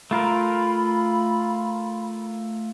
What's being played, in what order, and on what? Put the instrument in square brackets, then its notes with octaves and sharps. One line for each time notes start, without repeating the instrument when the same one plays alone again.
[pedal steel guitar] A3 F4 A#4 [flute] B5